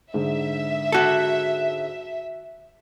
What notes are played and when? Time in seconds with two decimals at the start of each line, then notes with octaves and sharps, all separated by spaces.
0.14 G#2 D3 E5
0.92 F#4 A4